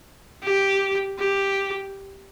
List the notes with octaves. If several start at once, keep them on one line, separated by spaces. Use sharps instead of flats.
G4
G4